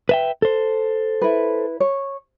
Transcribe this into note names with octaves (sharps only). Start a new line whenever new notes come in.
B4 E5 G5
A4 C5
E4 B4
C#5